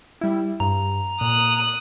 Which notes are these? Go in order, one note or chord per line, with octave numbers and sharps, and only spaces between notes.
G3 E4
G2 A#5
A#2 D#6 F#6